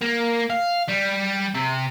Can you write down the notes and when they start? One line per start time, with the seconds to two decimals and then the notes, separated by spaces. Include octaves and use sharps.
0.02 A#3
0.50 F5
0.89 G3
1.55 C3